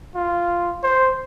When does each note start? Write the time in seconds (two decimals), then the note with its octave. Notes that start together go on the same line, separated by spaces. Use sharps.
0.15 F4
0.83 C5